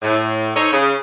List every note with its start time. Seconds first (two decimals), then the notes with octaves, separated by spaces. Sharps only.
0.02 A2
0.56 D#4 A4 C5 C#5
0.72 C#3